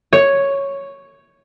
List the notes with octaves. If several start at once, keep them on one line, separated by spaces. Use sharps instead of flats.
C#5